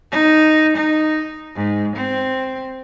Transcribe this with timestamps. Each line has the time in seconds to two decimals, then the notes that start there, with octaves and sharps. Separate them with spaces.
0.12 D#4
0.77 D#4
1.56 G#2
1.96 C4